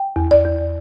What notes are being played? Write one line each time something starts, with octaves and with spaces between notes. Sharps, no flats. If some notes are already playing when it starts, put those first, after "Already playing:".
Already playing: G5
E2
D5
E2